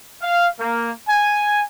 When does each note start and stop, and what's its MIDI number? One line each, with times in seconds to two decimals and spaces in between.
0.22 0.47 77
0.60 0.91 58
1.08 1.62 80